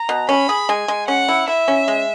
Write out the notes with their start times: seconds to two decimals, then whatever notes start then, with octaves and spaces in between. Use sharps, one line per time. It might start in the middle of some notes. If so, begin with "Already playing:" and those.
Already playing: A#5
0.09 B2
0.29 C#4 B5
0.49 G#4
0.69 G#3 G#5
0.88 G#3
1.08 C#4 F#5
1.28 E4
1.48 E4 E5
1.68 C#4
1.88 G#3